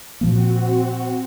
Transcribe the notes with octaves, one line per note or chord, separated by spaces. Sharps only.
A#2 F3 A#3 C4 F#4